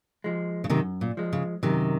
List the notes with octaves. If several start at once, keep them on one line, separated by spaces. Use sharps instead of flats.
F3 G#3
C#3
F#2 C3 D#3
A#2
F3 G#3
C#3
F#2 C3 D#3